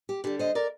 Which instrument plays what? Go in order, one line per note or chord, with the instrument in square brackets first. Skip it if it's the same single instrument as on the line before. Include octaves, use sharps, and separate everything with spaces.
[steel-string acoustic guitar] G4
D3 G3 G4
C5 D#5
A#4 D5